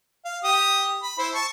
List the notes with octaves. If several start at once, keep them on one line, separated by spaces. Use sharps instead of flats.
F5
G4 D#6
B5
E4 C5
A5 C#6